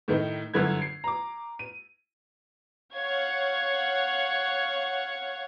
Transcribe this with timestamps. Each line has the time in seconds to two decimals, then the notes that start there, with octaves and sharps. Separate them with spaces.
0.08 A2 D#3 A3 D#4
0.54 G1 F#2 D3 E4 G#6
0.82 C7
1.04 A#5 D6
1.59 D#7
2.96 C#5 F5 F#5 C#6 G#6